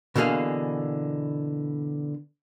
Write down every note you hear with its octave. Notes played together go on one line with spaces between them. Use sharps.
B2 D3 E3 A#3 G#4 F5